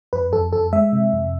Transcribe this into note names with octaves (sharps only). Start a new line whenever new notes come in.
F2 B4
F2 A4
F2 A4
G#3 E5
C3
F2